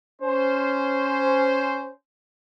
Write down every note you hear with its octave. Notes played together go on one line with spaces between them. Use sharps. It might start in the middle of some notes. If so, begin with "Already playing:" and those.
C#4 C5